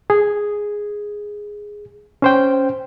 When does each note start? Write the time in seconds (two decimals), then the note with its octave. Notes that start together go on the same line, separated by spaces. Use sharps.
0.10 G#4
2.22 C#4 C5 G5